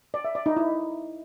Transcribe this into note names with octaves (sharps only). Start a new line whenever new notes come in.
D5
E5
D5
D#4
E4